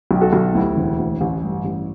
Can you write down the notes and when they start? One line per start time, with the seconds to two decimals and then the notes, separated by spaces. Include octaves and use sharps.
0.11 B1 G4
0.21 F#4 A4
0.33 B1
0.54 D2 E4 G4
0.77 E1
0.99 D2
1.21 A1
1.43 G2
1.65 A1